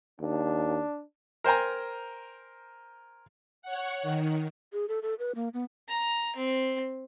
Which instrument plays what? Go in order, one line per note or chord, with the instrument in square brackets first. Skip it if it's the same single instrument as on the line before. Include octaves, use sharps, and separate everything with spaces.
[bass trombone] D#2 [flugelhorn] D4
[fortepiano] A#4 C5 G5 G#5 A#5
[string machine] C#5 F#5
D#3
[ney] G#4
A4
A4
B4
A#3
B3
[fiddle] A#5
C4